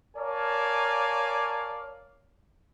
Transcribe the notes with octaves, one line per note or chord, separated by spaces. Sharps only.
A#4 C#5 D5 F5 G#5 A5